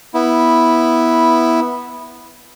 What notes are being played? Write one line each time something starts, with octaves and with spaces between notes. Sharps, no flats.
B3 E4